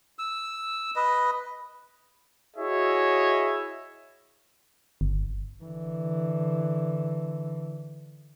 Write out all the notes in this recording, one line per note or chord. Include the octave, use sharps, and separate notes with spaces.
E6
B4 D#5
E4 F#4 G#4 C#5 D#5 E5
G1
D3 E3